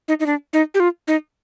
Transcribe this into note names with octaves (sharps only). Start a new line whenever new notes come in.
D#4
D#4
D4
D#4
G4
F4
D#4